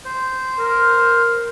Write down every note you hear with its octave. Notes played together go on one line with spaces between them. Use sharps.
C5
A#4